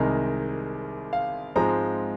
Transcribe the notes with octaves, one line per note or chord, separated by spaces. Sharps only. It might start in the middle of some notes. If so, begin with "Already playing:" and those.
Already playing: C2 C3 D#3 G#3 A#4
F5
G#2 F3 G#3 C4 A#5